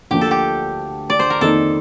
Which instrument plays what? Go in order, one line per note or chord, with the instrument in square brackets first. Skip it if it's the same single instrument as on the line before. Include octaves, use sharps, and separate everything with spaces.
[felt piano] D2 D3 F3 A#3 D4 [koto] G4
[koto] A4
G4
D5
C5
A#4
[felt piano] F2 D#3 A#3 D#4 [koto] A4